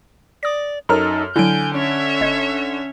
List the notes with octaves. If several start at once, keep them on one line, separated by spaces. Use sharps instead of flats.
D5 D#6 A#6
F#2 D#4 A4 A#4 C#5 A#5 F6
D3 F#3 E4 G#5 G6 D7
C#4 C#5 E5
G1 D#5 G#6